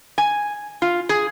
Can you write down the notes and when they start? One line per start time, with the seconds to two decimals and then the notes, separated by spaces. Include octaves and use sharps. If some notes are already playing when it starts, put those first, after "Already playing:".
0.18 G#5
0.82 F4
1.09 G#4